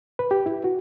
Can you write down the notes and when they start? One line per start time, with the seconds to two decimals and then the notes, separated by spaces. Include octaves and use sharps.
0.19 B4
0.31 G4
0.46 E4
0.64 F#4